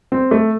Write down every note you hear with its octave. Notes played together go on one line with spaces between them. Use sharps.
C4
A3